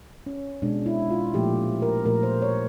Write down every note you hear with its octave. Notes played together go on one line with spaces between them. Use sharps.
C#4
B2 G#3 D4
E4
F4
A#2 F3 A3 G4
A#4
A#2 F3 A3 A#4
C5
C#5